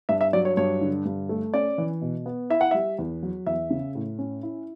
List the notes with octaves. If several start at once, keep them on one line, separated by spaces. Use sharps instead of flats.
G2 E5
E5
F#3 D5
C#5
G2 C#5
D3
G2
A3
C#4 D5
E3
B2
B3
E4 E5
F#5
G3 E5
E2
F#3
E2 E5
C#3
A2
C#4
E4